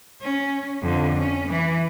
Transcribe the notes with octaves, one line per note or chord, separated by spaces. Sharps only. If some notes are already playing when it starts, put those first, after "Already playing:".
C#4
F2 D3
C#4
E3